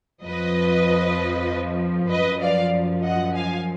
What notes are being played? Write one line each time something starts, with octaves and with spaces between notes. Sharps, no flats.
F2 F3 B4 D#5
F#2 F3 B4 D#5
D5 F5
D#5 F#5
F5 G#5